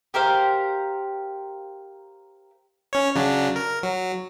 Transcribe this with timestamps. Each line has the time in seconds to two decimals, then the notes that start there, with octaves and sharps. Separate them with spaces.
0.14 G4 A#4 C5 F5
2.93 C#4 C#5
3.15 C#3 F#3 D4
3.56 A#4
3.83 F#3